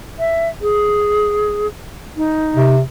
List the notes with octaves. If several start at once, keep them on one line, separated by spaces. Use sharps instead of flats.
E5
G#4
D#4
C3